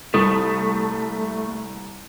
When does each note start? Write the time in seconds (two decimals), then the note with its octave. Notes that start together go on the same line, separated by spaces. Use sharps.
0.14 C2 A3 D#6